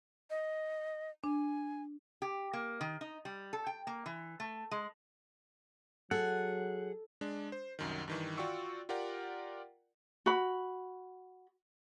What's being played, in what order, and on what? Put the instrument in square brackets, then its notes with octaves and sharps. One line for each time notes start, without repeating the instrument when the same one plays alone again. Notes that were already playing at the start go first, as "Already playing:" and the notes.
[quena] D#5
[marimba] D4 [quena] G#5
[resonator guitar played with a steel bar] G4
A#3
D#3
D#4
G3
A4
G5
A#3
E3
A3
G#3
[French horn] F#3 [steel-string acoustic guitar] G#4 [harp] A4 [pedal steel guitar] F#5
[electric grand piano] G#3 D4
C5
C2 F#2 D#3
G2 D#3 E3
F4 F#4 D5 G5 C#6 E6
F4 G4 A#4 D5 F#5 G5
[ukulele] F#4 B5